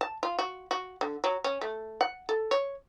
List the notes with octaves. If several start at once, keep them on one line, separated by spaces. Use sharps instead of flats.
A5
F4
F#4
F#4
D3
F#3
C#4
A3
F#5
A4
C#5